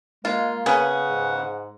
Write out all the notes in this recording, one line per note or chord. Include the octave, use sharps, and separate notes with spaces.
G#3 A#3 F4
C#3 B3 C#4 G#4 F#5
G#2